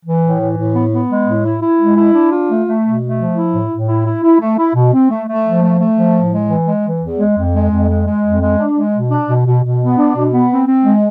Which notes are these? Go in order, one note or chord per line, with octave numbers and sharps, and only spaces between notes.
E3
A2
E3
A2
B3
B3
G#3
A2
E4
E4
G#3
E4
D4
F4
A3
A3
B2
A3
F3
E4
A2
A2
E4
E4
E4
A3
E4
B2
C4
A3
A3
F3
A3
A3
F3
A2
G#3
E3
G#3
E3
E2
G#3
F2
G#3
F2
G#3
G#3
F2
G#3
D4
G#3
B2
D4
B2
B2
B2
B3
D4
B2
B3
C4
C4
G#3